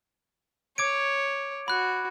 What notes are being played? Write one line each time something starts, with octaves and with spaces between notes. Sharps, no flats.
C#5 D6 G#6 D7
F#4 B5 F#6